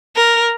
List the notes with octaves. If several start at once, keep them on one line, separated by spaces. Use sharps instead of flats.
A#4